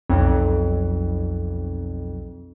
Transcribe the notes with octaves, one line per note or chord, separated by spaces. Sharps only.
B1 F2